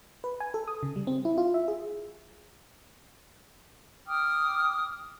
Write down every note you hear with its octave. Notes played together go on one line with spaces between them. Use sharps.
B4
G#5
A4
D#6
C#3
G3
C4
E4
F4
E5
G#4
G5 D6 D#6 F6